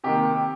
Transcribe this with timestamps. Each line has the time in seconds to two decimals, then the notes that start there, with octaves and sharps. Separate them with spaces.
0.04 C3 D#3 A#3 G4